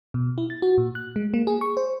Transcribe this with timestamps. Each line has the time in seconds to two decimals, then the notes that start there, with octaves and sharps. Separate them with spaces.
0.14 B2
0.38 E4
0.50 A6
0.62 F#4
0.78 A#2
0.95 F#6
1.16 G#3
1.34 A#3
1.47 G#4
1.61 C#6
1.77 C5